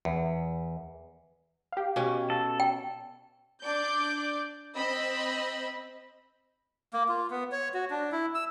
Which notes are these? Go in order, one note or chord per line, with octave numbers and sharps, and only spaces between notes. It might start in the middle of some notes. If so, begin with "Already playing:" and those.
E2
G4 F5
B2 C#4
A4
G5
D4 D5 D6 G6
C4 D#5 B5 E6
A#3
F4
B3
C#5
F#4
D4
E4
E6